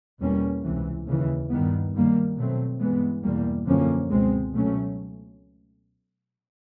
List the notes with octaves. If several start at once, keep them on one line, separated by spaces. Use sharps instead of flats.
E2 B2 G3 A#3 C#4
C#2 C3 E3
D#2 C#3 E3
G2 D#3 G3 B3
F#2 D#3 G3 A#3
B2 F#3 A3 C4
G2 E3 G#3 B3
E2 B2 G3 A#3
F#2 D3 F3 A#3 C#4
C#2 B2 G#3 C4
B2 F#3 A3 C#4